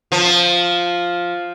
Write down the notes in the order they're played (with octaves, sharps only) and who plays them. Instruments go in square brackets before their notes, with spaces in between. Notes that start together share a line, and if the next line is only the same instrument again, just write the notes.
[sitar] F3